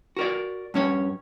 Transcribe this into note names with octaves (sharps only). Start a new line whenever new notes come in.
F#4 A#4 D5
G2 C#4 C#5